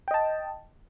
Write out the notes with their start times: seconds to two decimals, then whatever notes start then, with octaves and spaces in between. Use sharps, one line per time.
0.08 G5
0.11 D#5
0.14 A5